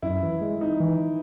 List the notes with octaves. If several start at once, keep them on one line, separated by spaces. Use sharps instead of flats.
F#2 E4
E3
G#3
D#4
E3